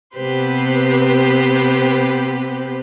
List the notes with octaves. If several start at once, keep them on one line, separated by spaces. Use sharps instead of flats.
C3 B3 G4 B4 C5